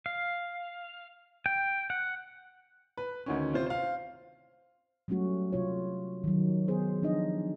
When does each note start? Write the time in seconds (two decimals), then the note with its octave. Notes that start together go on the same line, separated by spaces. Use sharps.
0.06 F5
1.46 G5
1.90 F#5
2.97 B4
3.26 D2 D#3 C#4
3.53 C3 F4 C5
3.66 C5 F5
5.08 F#3 G3 A3 C#4 F#4
5.52 C3 F4 C#5
6.24 D#3 F#3
6.68 B3 G#4 C5
7.02 F3 D4 D#4 D#5